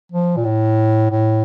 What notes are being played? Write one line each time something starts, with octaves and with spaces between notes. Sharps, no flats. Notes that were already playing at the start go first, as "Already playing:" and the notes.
F3
A#2
A2
A2